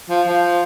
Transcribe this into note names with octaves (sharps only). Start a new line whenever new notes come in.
F3
F3